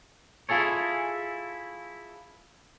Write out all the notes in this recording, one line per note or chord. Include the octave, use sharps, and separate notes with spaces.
E4 F4 G#4 A4 C#5